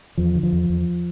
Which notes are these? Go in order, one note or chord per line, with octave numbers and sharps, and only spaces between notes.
E2 F3
D3
F3
E2
E2